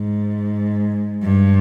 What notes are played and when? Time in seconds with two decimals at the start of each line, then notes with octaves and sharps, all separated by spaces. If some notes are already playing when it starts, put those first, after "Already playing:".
Already playing: G#2
1.23 G2